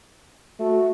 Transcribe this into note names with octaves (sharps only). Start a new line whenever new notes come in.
A3 F#4